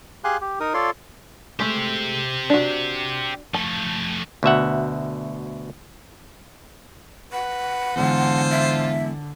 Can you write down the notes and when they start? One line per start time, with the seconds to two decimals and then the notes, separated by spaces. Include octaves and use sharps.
0.24 G4 G#4 F5 G#5 C6 F#6
0.41 G4
0.60 D#4 A#4 D#6
0.74 F4 A4 C#5 D5 C6
1.60 G#3 A3 G4 C5
2.50 D4 F#4
3.54 F3 A3 A5
4.43 D2 B2 E5 F#5
7.32 B4 F#5
7.96 E2 G#2 D3 F4 A4 C5
8.51 E5